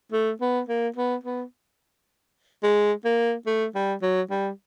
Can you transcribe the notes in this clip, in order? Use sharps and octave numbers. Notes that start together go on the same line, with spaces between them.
A3
B3
A#3
B3
B3
G#3
A#3
A3
G3
F#3
G3